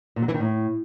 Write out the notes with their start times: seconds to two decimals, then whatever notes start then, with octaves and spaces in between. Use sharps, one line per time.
0.16 A#2
0.22 F#3
0.28 E3
0.34 D#3
0.40 A2